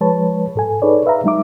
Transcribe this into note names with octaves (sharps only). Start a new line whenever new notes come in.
F3 G#3 B4 C#5 A5
G#2 A4 G#5
D#4 G#4 A4 B4 C#5 D5
B4 E5 F5 A#5
F#3 G#3 D#4 E5 D6